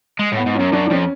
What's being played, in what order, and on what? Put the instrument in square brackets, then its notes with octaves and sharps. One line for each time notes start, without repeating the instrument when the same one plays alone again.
[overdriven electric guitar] G#3
A2
[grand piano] B3
[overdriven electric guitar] G#2
[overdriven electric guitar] F#2 [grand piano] C#4
[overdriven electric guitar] F#2 [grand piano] D4
[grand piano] D4
[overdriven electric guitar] F2 [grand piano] C#4